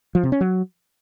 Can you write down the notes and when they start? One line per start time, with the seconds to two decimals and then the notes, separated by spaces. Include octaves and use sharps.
0.15 F3
0.23 C3
0.32 C#4
0.41 F#3